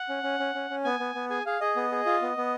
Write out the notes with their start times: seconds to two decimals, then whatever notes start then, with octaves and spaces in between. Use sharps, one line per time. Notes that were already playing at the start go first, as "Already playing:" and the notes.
Already playing: F#5
0.09 C#4
0.23 C#4
0.40 C#4
0.55 C#4
0.70 C#4
0.84 B3 G#5
1.00 B3
1.15 B3
1.30 G#4 G#5
1.46 G#4 F5
1.61 G#4 D#5
1.76 B3
1.92 G#4
2.06 F4
2.22 B3
2.37 B3